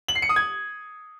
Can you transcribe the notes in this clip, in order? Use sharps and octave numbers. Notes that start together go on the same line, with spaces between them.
F#7
C7
C#7
D#6
G#6